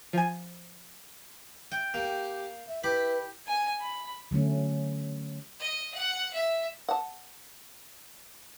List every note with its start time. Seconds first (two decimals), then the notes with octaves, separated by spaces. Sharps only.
0.13 F3 G#5
1.71 G5
1.94 A#3 G4
2.67 E5
2.84 E4 G4 B4 B5
3.47 G#5
3.80 B5
4.31 D3 F#3 A3 C#4
5.59 D#5
5.94 F#5
6.33 E5
6.89 F#5 A5